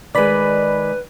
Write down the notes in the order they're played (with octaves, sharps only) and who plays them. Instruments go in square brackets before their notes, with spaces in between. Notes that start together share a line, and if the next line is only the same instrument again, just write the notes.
[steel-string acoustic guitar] D#3 G#3 [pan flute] B4 [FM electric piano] D5 B5